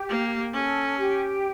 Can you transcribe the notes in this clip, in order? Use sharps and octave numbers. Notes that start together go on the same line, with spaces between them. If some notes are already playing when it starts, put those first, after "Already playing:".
Already playing: G4
A#3
C#4 A4
G4